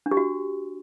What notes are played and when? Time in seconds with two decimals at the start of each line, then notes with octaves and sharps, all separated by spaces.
0.06 D4
0.11 G4
0.17 F#4